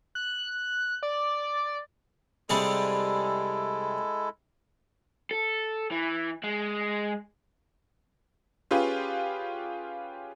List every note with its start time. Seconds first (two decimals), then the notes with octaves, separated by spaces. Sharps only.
0.15 F#6
1.03 D5
2.50 C3 G3 G#3 E4 G#4 A4
5.31 A4
5.91 E3
6.43 G#3
8.71 C#4 F4 G4 G#4 B4